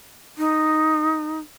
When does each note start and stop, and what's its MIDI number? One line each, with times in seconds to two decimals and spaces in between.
0.38 1.39 63